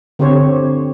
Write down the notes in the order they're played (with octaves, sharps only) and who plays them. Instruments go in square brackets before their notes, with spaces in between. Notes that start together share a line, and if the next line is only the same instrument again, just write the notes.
[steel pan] D3 C4 G4 C5 C#5